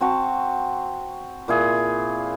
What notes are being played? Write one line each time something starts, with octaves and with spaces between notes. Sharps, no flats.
C4 F#4 A5 C#6
A#2 E4 G#4